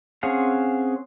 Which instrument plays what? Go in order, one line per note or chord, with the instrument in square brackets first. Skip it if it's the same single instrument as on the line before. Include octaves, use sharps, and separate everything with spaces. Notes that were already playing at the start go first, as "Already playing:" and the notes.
[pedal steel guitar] C4 C#4 G#4 F5 F#5